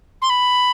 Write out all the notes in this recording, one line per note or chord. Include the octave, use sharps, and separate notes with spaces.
C6
B5